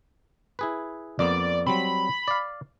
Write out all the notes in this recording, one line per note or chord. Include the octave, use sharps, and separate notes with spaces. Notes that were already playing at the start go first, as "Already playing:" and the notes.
E4 G#4 B4
F2 A#3 B3 D5
F#3 G3 C4 B5
D5 F5